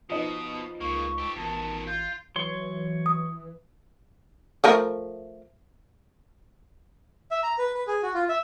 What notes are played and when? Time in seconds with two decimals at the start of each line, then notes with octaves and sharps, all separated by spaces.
0.10 B2 F3 D#4 B4 D#6
0.81 C#2 C#3 A#3 C#6
1.18 G4 A4
1.36 A1 B2 D#3 A5
1.87 F4 G6
2.36 E3 F#3 C#5 C6
3.06 D#6
4.64 F3 A3 A#4
7.31 E5
7.43 A#5
7.59 B4
7.75 B4
7.87 G#4
8.03 F#4
8.14 F4
8.29 E5